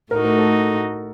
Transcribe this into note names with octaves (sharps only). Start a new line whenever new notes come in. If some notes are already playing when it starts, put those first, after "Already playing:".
A2 A3 D#4 F#4 A#4
A#4
A4